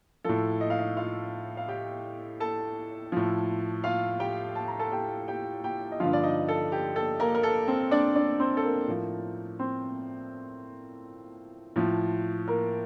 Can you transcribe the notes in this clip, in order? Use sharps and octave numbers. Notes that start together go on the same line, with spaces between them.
A2 F3 A4
D#5
F5
D#4 D#5
F4 F5
F5
G4 G5
A4 A5
A2 F3
F4 F5
G4 G5
A5
A#5
A4 A5
G4 G5
G4 G5
G4 G5
D#5
G2 D3 F3 F4 F5
D5
D#4 D#5
A4
G4
A4
A#3 A#4
A#4
A4
C4 C5
D4 D5
D4 D5
C4 C5
A4
A#3 A#4
A2 F3
C4 C5
A2 F3
A#3 A#4